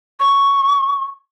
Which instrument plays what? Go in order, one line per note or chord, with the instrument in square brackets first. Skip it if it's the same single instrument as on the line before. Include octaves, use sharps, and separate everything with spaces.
[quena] C#6